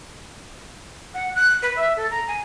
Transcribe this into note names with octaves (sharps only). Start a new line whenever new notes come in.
F#5
F#6
B4
E5
A4
A#5
G#5